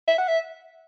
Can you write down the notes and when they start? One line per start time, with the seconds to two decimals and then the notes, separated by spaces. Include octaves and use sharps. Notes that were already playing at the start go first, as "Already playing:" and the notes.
0.08 E5
0.18 F#5
0.28 E5